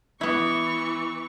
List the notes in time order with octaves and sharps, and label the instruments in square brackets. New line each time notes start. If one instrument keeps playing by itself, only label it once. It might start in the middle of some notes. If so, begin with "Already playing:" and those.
[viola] E3 C#6 [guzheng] B3 E4